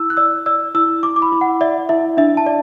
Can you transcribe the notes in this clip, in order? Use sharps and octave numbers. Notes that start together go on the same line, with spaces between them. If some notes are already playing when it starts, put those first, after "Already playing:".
Already playing: E4 E6
F#6
D5 E6
D5 E6
E4 E6
E4 D6
D6
B5
E4
F#5
D5 E5
E4 E5
D4 E5
A5
D5